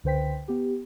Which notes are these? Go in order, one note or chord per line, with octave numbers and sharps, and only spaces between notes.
C#2 D3 B4 C5 G5 B6
B3 G4